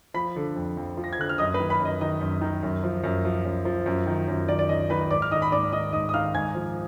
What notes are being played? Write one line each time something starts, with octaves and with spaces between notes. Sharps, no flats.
F3 B5 B6
D3
F2
F2
F3
A#6
G#6
D3 F#6
F6
F#2 D#5 D#6
B4 B5
D#3
B4 B5
F#2
D#5
D#3 D#5
F#2
D#3
F#2
F3
F#2
F3
F#2
F3
F#2
D#3
F#2
D#3 D5
D5
F#2 D#5
D#3 B4 B5
G#2 D5 D6
F6
D#3 D#5 D#6
B5
G#2 D5 D6
D#3 D#5 D#6
G#2 D#5 D#6
D#6
D#3 F5 F6
G#2 G#5 G#6
F3